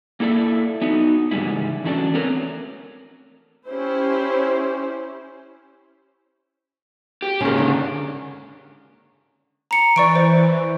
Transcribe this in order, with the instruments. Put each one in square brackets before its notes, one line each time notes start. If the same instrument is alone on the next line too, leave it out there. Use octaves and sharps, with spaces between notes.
[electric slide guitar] A#3 E4 A4 D5 E5
B3 D#4 F#4
G#2 C#3 E3 G3 G#3 E4
E3 A3 C#4 D4 F#4 D5
A3 B3 C4 A#4 B4 C#5
[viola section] C#4 E4 G4 C5
[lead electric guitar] G4
[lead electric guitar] D#2 G#3 [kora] C#3 A#4
[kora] D3
[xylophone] A#5 C#7
[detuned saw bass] E3 [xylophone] D5 C#6 D7
[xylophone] C5